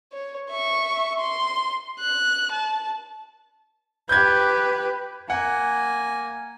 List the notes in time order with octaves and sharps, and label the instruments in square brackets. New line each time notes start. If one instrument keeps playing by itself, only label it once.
[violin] C#5
E5 C#6
C6
F#6
A5
[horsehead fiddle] G4 B4 [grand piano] G6 G#6
[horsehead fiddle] A#3 [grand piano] F#5 [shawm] G#5